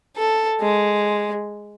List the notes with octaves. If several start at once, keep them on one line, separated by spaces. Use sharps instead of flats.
A4
G#3